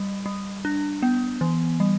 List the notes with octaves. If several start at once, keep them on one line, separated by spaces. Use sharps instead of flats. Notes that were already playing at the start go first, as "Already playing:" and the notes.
Already playing: G3
G3
D4
B3
E3
G3